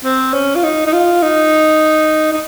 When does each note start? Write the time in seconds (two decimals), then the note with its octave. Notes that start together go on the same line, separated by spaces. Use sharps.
0.04 C4
0.33 C#4
0.55 F4
0.63 D#4
0.86 D#4
0.93 F4
1.22 D#4
2.32 D#4